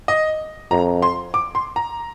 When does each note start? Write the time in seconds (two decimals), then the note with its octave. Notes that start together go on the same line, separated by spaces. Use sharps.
0.08 D#5
0.71 F2 A#5
1.02 C6
1.34 D6
1.55 C6
1.76 A#5